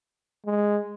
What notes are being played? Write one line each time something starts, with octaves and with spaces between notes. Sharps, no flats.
G#3